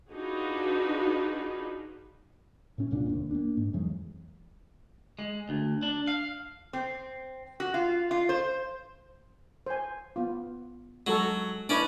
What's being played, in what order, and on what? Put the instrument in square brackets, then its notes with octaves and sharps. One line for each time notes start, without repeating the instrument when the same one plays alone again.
[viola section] D4 D#4 F4 F#4 G#4 B4
[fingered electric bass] A2 C#4
F#1 C2 A#2 D4
F1 D#2
A#3 D4
G#2
F2 E3 F#3 G#3
[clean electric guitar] G#3
D2
D4
F5
[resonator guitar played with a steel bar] C4
F#4
F4
F4
C5
[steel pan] C5 G#5
B3 F4
[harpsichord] F#3 [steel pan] G#3 F#4 A4
[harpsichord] C#4 D5 [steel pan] D4 E4 B4